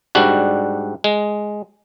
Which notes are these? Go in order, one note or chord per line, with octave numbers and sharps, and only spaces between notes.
G#2 G3 D4 F#4
G#3